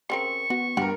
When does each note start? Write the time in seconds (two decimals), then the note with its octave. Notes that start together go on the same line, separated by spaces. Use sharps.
0.10 C#3 C4 A#4 C#6
0.50 B3 F#4
0.77 G2 G4 A#4 F#5